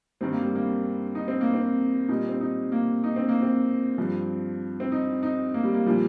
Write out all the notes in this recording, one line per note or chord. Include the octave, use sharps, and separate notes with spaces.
G2 D#3 G3 C4
A#3
G3
A#3
D#4
C4
A#3
C4
A#2 G3 D#4
C4
D#4
A#3
D#4
C4
A#3
C4
G2 F3
C4
D#4
D#4
A#3
G3
A#3
A#2 F3 G3